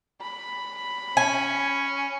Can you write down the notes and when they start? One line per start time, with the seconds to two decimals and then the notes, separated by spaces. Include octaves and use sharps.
0.22 B5
1.17 C#4 G#5